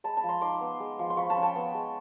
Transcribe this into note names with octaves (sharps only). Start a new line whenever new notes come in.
G#3 A5 B5
A5 B5
F3
A#5 C6
D#4 C6 D6
B3
G#3
F3
C6
F3 B5 C#6
A5 B5
C#4
G5 A5
B3
G#3